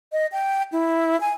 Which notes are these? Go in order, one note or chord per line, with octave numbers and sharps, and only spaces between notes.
D#5
G5
E4
G#5